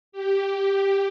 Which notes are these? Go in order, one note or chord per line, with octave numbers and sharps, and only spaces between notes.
G4